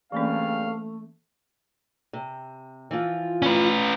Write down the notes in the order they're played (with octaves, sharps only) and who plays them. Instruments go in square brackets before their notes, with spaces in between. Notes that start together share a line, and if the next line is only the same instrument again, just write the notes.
[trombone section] G2 C#3 C4 [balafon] E3 A#3 C#4 [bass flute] A3 [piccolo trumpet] F5
[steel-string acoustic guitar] C3
E3 F3 F4
[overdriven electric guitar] C#4 B4